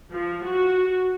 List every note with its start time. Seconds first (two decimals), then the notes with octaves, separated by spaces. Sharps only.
0.12 F3
0.45 F#4